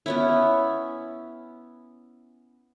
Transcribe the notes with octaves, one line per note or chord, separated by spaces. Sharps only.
B3 C#4 E4